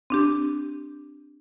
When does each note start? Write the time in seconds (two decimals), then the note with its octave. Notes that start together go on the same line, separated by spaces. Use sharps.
0.10 C4 D4 G4